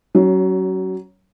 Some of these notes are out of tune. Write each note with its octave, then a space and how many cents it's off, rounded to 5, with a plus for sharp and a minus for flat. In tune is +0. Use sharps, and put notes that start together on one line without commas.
F#3 +25 C#4 +0